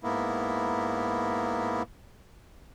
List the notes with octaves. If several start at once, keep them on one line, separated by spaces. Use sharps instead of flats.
G#2 A#3 B3 E4